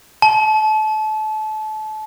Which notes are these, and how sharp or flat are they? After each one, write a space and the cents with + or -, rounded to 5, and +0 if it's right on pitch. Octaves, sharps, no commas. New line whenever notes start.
A5 -30